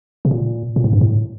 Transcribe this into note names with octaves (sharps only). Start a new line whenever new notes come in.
C3
A#2
A#2
A2
G2
A2